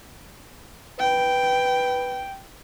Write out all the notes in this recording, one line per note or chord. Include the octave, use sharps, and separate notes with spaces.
B4 G5